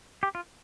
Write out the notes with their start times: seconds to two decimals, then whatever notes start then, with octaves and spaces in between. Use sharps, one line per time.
0.23 G4
0.35 F4